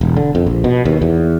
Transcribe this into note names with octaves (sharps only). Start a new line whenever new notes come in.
E1
D3
F2
A#1
B2
D#2
E2